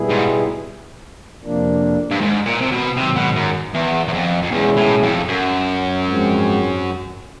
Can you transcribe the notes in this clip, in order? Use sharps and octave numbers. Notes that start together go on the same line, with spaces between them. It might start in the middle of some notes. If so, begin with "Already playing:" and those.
Already playing: B2 G3 B3 E4 G#4
G#2
F2 C3 F3 A#3 D4
G2
G#2
A#2
C3
B2
G#2 C3 D#3 F#3
B2
F#2
E2
E2
F2
F2
E2 B2 G#3 C#4 E4 G#4
A2
F2
F#2
G#2 F3 G#3 C4